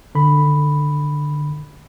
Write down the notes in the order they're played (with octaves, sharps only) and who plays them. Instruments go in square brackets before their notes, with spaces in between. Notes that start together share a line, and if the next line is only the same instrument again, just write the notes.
[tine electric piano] D3 B5